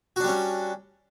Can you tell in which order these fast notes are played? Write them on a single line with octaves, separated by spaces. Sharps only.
F#4 D4 G3 C#4